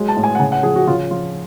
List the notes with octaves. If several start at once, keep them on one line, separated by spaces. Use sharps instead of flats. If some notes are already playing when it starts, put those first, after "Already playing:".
Already playing: F#3 G#3
A5
A2
G#5
F#5
C#3 G#5
F#5
F3 G#4
F#4
C#3 F4
F3 F4